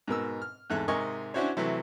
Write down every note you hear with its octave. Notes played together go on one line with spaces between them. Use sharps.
G#2 B2 A#4 E6
F6
E2 G#2 A4 E5 F#6
G#2 C3 A#4 D#5 G#5 C#6
C#4 D4 E4 F#4 C5 C#5
C3 E3 F#3 A3